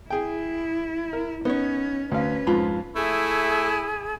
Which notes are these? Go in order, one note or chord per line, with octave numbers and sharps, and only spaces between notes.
E4 G#4 G5
A#4
B3 C#4 D#4 C#5
D2 C#4 B4 F5
F2 G#2 F4 B5
A3 E4 G#4